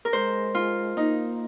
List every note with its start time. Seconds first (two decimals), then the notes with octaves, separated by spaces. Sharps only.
0.05 A#4
0.13 G#3 C5
0.55 F4
0.97 A#3 D#4